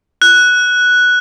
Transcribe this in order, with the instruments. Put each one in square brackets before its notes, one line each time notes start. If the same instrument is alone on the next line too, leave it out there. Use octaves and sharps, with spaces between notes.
[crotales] F#6